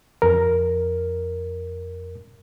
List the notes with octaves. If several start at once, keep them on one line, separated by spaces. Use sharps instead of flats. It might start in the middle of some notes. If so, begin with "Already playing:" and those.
F2 A#4